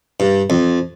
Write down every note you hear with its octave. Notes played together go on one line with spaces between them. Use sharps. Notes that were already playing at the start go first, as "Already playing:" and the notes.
G2
F2